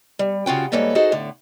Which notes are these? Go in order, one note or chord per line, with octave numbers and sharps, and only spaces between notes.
G3
C#3 F4 F#4 G5
G#2 G3 A#3 A4 B4 C#5
D#4 F#4 G#4 A4 C5 D#5
A2 D3